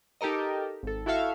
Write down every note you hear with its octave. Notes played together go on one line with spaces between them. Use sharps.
D#4 G4 A4 A#4 D#5
G#1 A4
E4 F#4 A4 E5 F5